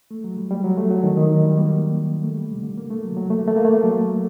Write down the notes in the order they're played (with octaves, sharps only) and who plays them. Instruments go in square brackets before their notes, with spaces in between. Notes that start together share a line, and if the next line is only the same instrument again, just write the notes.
[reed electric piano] A3
F#3
G3
G3
F#3
A3
F#3
D#3
D#3
F#3
G3
A#3
A3
G3
C3
D3
A#3
A3
F#3
F#3
A3
A#3
A3
A#3
A3
F#3